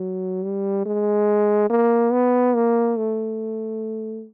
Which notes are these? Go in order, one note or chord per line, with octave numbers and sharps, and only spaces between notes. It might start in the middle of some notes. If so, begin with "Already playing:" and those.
Already playing: F#3
G3
G#3
A#3
B3
A#3
A3